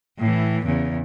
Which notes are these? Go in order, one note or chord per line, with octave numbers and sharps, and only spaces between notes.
A2 E3
E2 C#3